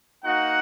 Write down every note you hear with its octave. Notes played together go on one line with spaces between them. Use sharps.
A#3 D#4 F#4 F#5